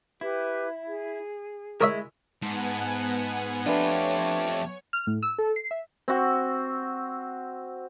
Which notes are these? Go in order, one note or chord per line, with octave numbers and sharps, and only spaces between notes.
E4 G4 B4
G#4
G#3 E4 A#4 C#5 E5
G#2 B3 F#5 G#5 A5
F2 A3 D4 F4 G4 B4 C#5 A5
F6
A2
E6
A4
C7
E5
C4 F#4